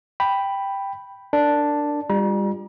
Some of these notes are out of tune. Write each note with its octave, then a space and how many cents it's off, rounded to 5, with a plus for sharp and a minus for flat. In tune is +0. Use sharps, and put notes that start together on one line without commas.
G5 +5 B5 +0
D4 +0 A#4 -20
G3 +30 F4 +20 A#5 +40